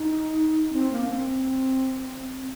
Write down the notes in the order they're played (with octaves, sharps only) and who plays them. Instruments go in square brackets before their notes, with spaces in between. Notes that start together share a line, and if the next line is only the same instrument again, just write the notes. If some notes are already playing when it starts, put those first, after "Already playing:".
Already playing: [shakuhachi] D#4
C4
A#3
D4
C4